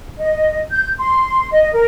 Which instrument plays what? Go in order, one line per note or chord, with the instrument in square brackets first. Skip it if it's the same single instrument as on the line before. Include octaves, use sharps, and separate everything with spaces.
[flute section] D#5
G6
C6
D#5
A#4